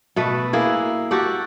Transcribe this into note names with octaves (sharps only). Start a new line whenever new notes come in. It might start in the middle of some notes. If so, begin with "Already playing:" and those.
B2 A3 B4
A#3 E4 G#4
F#4 G4 A4 D5